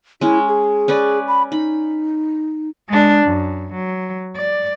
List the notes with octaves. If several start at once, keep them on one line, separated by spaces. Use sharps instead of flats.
G#3 C#4 E4
G#4
C#4 B4 D5
B5
D#4 B5
G#3 D4
F#2
F#3
D5